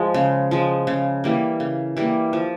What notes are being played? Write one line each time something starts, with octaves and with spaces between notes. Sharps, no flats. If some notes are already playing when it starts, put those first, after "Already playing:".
Already playing: F3 G#3
C#3
F3 G#3
C#3
E3 G3 A#3
C#3
E3 G3 A#3
F3